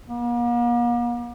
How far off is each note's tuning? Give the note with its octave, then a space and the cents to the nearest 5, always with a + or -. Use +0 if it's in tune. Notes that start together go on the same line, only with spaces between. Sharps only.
A#3 +45